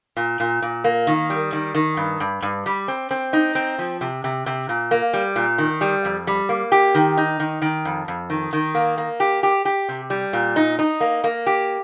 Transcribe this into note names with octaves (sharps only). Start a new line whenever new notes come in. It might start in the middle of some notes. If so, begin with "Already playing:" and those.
A#2
A#2
A#2
A#3
D#3
G3
D#3
D#3
G2
G2
G2
G3
C4
C4
D#4
C4
F3
C3
C3
C3
A#2
A#3
G3
A#2
D#3
G3
F2
G3
A#3
G4
D#3
D#4
D#3
D#3
F2
F2
D#3
D#3
A#3
A#3
G4
G4
G4
C3
G3
A#2
D#4
D#4
A#3
A#3
G4